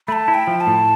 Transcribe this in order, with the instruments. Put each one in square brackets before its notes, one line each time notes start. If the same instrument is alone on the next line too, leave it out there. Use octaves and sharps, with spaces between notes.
[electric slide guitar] A3 [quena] A5 B5
[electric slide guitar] E4
[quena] G5
[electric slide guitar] F3
[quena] A5
[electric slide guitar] A2